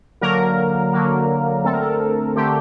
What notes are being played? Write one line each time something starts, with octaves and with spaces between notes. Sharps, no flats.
D3 F#3 A#3 A#4
D3 F#3 A#3
D3 A3 C4 A4
A#4
A4
D3 A3 C4 G4